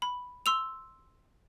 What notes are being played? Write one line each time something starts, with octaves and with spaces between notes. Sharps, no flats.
B5
C6 E6 F7